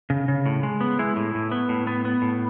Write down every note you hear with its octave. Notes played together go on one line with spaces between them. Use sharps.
C#3
C#3
A2
G#3
B3
G#3 E4
A2
A2
B3
A2
B3
B3
A2